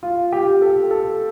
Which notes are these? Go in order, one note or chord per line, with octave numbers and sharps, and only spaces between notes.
F4
G4
A4
A4